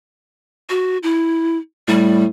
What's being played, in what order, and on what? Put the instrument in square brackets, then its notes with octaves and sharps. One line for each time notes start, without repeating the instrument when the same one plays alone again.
[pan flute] F#4
E4
[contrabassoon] A2 [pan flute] G3